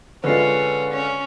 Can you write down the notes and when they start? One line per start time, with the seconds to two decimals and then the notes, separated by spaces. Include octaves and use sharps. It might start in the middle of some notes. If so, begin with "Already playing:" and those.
0.24 D3 G#3 C#4 F4 B4 C7
0.92 C#4